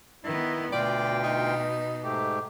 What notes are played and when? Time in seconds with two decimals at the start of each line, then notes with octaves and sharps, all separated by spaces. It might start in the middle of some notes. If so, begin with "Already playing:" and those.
0.24 D#3 B3 E4
0.72 D2 B2 F4 D5 G5
1.24 D#4
2.04 G#2 A3 G4